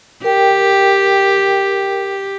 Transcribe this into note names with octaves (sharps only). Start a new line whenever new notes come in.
G4 A#4 G5